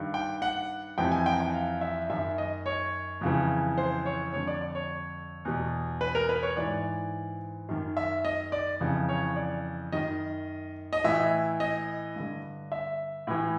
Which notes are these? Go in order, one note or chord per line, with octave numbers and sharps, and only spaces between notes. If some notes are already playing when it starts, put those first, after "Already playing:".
Already playing: G2 D#3
G5
F#5
F2 C3 E3 G5
G#5
G5
G5
F5
E5
F#2 D#3 E5
D#5
C#5
F2 C#3 E3
C5
C#5
F2 D3 C#5
D5
D5
C#5
E2 B2
B4
A#4
B4
C#5
G#2 E3 D5
F#2 D#3
E5
D#5
D5
F2 C#3 E3
C#5
D5
F#2 D#3 D#5
D#5
A2 E3 E5
D#5
G2 D3
E5
A2 E3